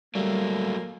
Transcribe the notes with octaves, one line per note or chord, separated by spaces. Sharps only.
F#3 G3 A3 A#3